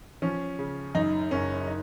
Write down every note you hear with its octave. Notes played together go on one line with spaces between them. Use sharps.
F3 C#4
C#3
F#2 D#4
F#1 C#4
D#4